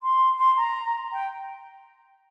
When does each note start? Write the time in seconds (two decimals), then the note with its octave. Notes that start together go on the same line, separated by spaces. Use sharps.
0.02 C6
0.38 C6
0.57 A#5
1.12 G5